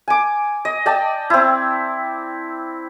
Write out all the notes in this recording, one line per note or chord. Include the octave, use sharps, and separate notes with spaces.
G#5 D6
D#5
D5 D#5 G5 A5
C4 E4